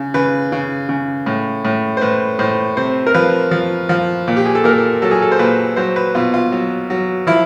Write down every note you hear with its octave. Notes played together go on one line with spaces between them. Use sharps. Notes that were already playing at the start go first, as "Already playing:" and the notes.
Already playing: C#3
C#3 B4
C#3
C#3
A2
A2
C5
A2 B4
A2 C5
C3 C5
A#4
F3 B4
F3
F3
A#2
G4
G#4
A4
A#2 A#4
F#3 A4
G#4
A4
C5
A#2 B4
F#3 C5
B4
B2 F4
F4
F#3
F#3
F3 E4